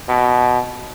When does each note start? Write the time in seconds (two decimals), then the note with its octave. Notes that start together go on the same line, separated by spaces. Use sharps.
0.09 B2